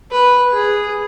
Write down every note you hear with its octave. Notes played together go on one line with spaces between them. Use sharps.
B4
G#4